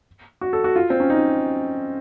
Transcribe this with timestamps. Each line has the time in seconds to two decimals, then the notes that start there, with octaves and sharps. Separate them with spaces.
0.41 F#4
0.53 A4
0.64 F#4
0.76 F4
0.90 C4
1.00 C#4
1.10 D#4